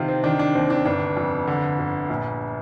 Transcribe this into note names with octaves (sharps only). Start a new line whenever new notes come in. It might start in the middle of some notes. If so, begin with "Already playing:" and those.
Already playing: C3 D#3 F4
C4
D#3 D4
D4
D#2 C4
D4
G1 D4
F2
D3
G1
A#1